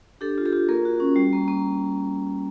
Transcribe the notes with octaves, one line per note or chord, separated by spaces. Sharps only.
D4 G4 A4
F4
G4 A4
F4
A#3 G#4 A#4
F#4
C#4
G3
A#3
A#3